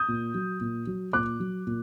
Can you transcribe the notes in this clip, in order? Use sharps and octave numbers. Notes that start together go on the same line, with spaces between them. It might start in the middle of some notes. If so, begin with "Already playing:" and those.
Already playing: D#6 G6
A#2
F#3
A#2
F#3
A#2 D6 F#6
F#3
A#2